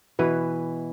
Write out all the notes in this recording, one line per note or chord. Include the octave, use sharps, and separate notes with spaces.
B2 E3 B4